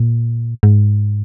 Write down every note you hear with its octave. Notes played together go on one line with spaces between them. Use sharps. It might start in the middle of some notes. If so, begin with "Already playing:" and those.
Already playing: A#2
G#2